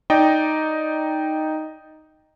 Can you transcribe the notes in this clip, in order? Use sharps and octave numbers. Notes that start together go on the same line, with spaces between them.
D#4 D5 D#5 G5